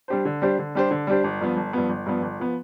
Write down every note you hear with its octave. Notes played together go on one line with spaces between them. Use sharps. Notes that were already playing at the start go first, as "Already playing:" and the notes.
G3 D4 G4 C5
D3
G3 D4 G4 C5
D3
G3 D4 G4 C5
D3
G3 D4 G4 C5
G1
G2 F3 B3
G1
G2 F3 B3
G1
G2 F3 B3
G1
F3 B3